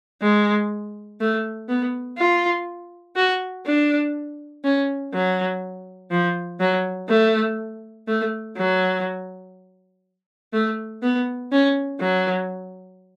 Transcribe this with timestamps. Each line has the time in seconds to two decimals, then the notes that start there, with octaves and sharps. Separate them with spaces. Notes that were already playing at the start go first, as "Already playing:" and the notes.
0.22 G#3
1.20 A3
1.69 B3
2.18 F4
3.16 F#4
3.66 D4
4.64 C#4
5.14 F#3
6.11 F3
6.60 F#3
7.09 A3
8.08 A3
8.57 F#3
10.53 A3
11.02 B3
11.52 C#4
12.00 F#3